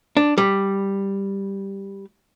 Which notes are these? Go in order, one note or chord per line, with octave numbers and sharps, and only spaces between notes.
D4
G3